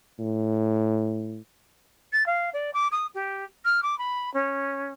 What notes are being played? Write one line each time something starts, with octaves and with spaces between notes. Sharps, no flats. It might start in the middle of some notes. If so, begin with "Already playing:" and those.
A2
A6
F5
D5
D6
D#6
G4
F6
D6
B5
C#4